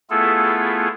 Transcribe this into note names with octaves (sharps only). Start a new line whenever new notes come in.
A3 B3 E4 F4 G#4 A4